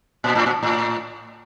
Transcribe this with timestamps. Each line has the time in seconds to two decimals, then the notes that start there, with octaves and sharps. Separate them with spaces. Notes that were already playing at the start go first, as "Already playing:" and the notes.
0.24 A#2
0.35 A2
0.46 A#2
0.63 A2